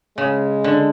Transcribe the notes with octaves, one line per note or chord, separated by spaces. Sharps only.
C#3 G#3
D3